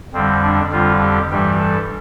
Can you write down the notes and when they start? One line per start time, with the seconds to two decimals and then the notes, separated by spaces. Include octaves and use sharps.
0.13 F2 D3 G3 C4
0.43 D4
0.72 F2 D3 G3 F4
1.01 G4
1.30 G2 E3 G3 G4
1.58 A4